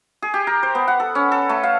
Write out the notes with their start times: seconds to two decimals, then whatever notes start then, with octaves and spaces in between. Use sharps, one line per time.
0.22 G#4
0.34 G4
0.47 A#4
0.63 C5
0.75 B3
0.88 F#5
1.00 A4
1.15 C#4
1.32 A4
1.49 A3
1.63 F5